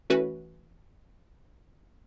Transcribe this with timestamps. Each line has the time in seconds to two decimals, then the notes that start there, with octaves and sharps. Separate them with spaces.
0.10 E3 A3 C#4 F#4 B4